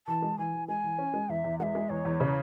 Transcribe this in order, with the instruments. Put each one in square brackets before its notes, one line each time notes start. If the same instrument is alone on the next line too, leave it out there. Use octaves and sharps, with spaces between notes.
[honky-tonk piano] E3 [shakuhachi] A5
[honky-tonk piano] G#3
[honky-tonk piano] E3 [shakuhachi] G#5
[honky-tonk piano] E3
[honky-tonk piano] G#3 [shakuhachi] G#5
[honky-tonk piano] E3
C#4
G#3
[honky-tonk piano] E2 [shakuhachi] E5
[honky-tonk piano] E2
[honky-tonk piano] G#3 [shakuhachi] E5 F#5
[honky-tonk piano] G#3
[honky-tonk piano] E2 [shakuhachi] C#5
[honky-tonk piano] E2
C#3